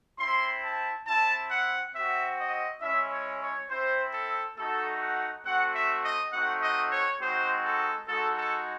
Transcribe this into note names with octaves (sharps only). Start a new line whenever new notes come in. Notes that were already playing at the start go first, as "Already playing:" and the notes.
C4 E4 C6
A5
C4 E4 A5
F#5
C4 F#4 E5
D#5
G#3 C#4 E4 E5
C#5
C#5
C4 E4 C5
A4
A3 D#4 F#4 A4
F#5
A3 C4 F#4 F#5
E5
D#5
A3 C4 D#4 F#4 F#5
D#5
C#5
G#3 C4 D#4 F#4 C5
A4
G#3 D#4 F#4 A4
A4